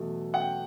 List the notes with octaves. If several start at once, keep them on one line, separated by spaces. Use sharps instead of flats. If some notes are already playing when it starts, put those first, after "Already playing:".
Already playing: E2 B2 F#3 A3
F#5
G5